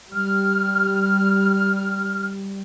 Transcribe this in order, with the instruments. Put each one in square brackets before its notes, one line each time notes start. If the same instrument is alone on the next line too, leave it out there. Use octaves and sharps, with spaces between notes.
[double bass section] G3 [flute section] F6